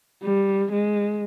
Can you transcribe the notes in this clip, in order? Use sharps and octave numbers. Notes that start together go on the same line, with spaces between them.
G3
G#3